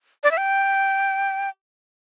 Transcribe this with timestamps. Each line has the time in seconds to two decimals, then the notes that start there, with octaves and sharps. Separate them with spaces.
0.23 D5
0.31 E5
0.38 G5